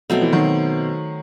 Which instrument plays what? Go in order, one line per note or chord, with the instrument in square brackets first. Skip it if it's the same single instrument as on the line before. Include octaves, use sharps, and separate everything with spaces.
[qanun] B2 A3 C4 [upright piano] F#3
[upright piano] E3
D#3 F#3